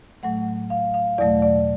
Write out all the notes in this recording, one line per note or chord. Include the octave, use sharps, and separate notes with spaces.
A2 F#3 A3 F#5
F5
F5
E2 B2 F#3 A3 D5
D5